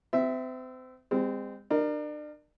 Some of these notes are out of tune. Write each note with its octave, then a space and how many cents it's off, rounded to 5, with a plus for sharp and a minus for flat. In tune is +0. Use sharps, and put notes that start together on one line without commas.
C4 -35 E5 +0
G#3 -40 C4 -20
D4 +35 A#4 +0